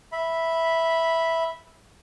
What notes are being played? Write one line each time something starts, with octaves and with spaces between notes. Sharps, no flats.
E5 B5